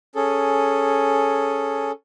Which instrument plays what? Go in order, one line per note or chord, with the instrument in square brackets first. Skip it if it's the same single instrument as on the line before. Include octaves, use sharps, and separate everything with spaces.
[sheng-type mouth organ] C#4 G#4 A4